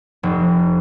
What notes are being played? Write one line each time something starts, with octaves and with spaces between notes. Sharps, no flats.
F1